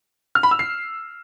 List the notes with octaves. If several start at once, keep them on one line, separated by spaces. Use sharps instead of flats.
F6
B5
E6
C7